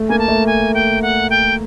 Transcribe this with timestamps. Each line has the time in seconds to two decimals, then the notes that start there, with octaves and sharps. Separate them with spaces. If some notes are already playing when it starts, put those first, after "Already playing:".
Already playing: A3
0.09 A#3 G#5
0.19 A5
0.28 A3
0.47 G#5
0.74 G5
1.02 F#5
1.30 G5